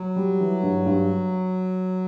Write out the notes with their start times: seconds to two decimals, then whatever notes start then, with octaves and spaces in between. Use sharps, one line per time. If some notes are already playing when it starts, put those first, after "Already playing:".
Already playing: F#3
0.16 G3
0.40 E3
0.63 G2
0.86 G2